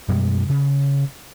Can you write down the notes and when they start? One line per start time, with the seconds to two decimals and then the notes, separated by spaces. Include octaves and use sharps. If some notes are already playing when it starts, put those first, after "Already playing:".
0.08 F#2 B2 G3 G#3
0.49 C#3